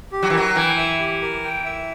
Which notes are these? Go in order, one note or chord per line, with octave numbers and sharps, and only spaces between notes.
G4
F#3
E3
F#3 A#4
E3 G5
E5
G4
A#4
G5
E5